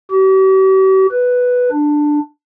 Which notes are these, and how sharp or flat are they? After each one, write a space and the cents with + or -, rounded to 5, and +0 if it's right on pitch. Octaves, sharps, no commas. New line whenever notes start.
G4 -45
B4 +0
D4 +10